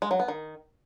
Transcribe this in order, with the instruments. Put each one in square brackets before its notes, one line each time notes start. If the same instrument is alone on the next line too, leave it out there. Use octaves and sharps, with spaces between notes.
[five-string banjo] G#3
F#3
B3
D#3